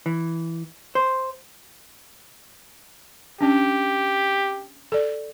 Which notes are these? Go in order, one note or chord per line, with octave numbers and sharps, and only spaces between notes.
E3
C5
C#4 D4 G4
A4 D5